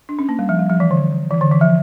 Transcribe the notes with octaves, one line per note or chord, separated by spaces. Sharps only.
D4
C#4
A#3
G3
F3
G3
F3
E3
D3
E3
D3
E3
F3